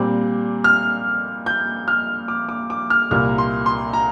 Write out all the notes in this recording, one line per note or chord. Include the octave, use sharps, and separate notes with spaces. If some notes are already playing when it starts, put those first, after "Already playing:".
Already playing: A#2 G3 C4 D6
F6
G6
F6
D6
D6
D6
F6
C2 A#2 A#3 F6
C6
C6
A#5